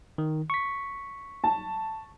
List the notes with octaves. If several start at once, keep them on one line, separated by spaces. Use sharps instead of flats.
D#3
C#6 B6
A5